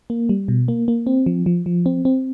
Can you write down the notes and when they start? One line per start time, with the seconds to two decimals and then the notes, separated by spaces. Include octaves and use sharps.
0.10 A#3
0.29 G3
0.48 B2
0.68 A#3
0.88 A#3
1.07 C4
1.26 F3
1.46 F3
1.66 F3
1.86 C4
2.05 C4